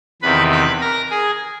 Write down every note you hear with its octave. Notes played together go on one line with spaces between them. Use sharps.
E2 C3 D#3 B4 B5
B4 B5
A#4 A#5
G#4 G#5